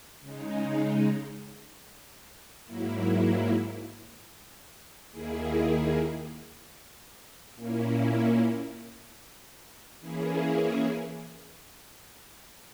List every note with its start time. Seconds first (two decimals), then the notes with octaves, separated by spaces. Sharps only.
0.21 C#3 G#3 D#4
2.65 G#2 F#3 A#3 E4
5.10 D#2 D#3 A#3 E4 G#4
7.55 A#2 A#3 C#4 E4
10.00 E3 A#3 C#4 E4 G#4